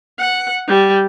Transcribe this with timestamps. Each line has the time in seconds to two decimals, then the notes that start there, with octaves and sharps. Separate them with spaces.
0.19 F#5
0.68 G3